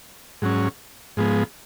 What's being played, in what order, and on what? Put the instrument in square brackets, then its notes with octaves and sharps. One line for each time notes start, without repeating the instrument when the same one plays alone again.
[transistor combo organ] G#2 F#3 C#4
G#2 F3 G#3 B3